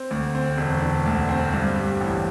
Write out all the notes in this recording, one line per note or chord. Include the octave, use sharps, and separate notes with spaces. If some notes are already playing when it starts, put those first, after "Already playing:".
Already playing: C4
D2
C4
E1
D3
D2
C4
G2
G3
A1